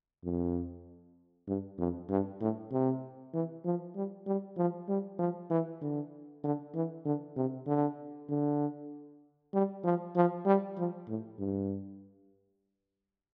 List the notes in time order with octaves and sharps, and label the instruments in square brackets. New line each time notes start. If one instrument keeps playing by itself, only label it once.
[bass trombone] F2
G2
F2
G2
A2
C3
E3
F3
G3
G3
F3
G3
F3
E3
D3
D3
E3
D3
C3
D3
D3
G3
F3
F3
G3
F3
A2
G2